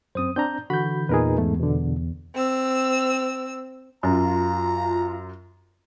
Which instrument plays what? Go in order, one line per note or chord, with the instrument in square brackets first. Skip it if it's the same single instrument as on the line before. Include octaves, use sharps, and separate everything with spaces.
[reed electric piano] F#2 D#6 [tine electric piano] C4 C5
[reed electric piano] C4 D4 A#5 [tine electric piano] G6
[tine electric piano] D3 E3 G6 [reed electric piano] F#4 B5
[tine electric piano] E2 A#2 D#4 [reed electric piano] G#4 A#4 B4
[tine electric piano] E2 [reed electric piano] G#2 A3
[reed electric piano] B2 D3
[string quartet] C4 E6
[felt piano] F#2 [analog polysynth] F4 [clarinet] A#5